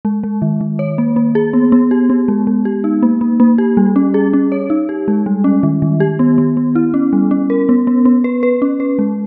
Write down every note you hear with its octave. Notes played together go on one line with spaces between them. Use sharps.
G#3
G#3
D#3
D#3
C#5
A#3
A#3
G#4
B3
B3
G4
B3
G#3
G#3
G4
D#4
A#3
A#3
A#3
G4
G3
C#4
G#4
C#4
C#5
D#4
G4
G#3
G3
C#4
D#3
D#3
G4
B3
B3
B3
E4
C#4
G3
C#4
A#4
B3
B3
B3
B4
B4
C#4
B4
G#3